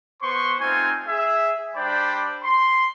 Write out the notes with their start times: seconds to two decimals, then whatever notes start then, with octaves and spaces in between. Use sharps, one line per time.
0.21 B3 C5 C6 C#6
0.59 A3 C4 D#4 F4 C5 G#5
1.07 G#4 E5
1.75 G3 D4 C5 D5 G5 B5
2.43 C6